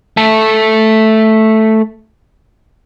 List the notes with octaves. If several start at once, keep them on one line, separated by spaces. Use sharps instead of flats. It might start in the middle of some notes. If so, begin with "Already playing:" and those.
A3 A4